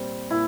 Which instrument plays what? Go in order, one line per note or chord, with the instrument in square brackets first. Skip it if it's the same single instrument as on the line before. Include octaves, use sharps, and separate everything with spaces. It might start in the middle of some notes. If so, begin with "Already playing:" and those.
Already playing: [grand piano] A#2 G3 C4
[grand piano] A#2 [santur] E4